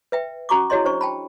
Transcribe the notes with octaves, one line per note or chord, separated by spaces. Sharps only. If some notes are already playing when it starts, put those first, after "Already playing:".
B4 E5 G5
C#4 F#4 A#5 C#6 D6
E4 F#4 G#4 C#5 D#5 C6
D4 C5 C#6
G5 A5 B5